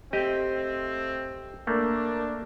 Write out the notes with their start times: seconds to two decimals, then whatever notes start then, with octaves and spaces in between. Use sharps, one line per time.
0.13 A3 C4 G4 D#5
1.67 A3 A#3 D4 A#4